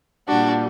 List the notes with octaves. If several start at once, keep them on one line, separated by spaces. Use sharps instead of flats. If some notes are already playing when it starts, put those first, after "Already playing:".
A#2 G3 D4 F#4